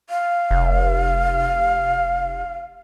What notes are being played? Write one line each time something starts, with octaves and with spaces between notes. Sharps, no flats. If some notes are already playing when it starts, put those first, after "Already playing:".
F5
F1